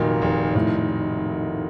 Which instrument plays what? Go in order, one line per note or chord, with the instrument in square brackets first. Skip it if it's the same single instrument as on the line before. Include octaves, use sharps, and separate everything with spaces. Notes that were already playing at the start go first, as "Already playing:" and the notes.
Already playing: [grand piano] F1 D#3 F#3 [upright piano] A#2
[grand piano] F1
[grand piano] F1 [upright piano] A2